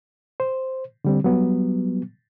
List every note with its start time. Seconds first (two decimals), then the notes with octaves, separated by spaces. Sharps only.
0.40 C5
1.05 D3 G3 C4
1.24 F#3 G3 B3